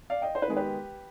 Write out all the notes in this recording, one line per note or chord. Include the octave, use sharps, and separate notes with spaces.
D5 F5
D#5 G5
C5
B4
D#3 G#3 B3 G#4
G4 B4